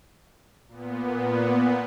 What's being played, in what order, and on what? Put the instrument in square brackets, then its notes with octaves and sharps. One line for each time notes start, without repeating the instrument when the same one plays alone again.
[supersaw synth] A#2 B3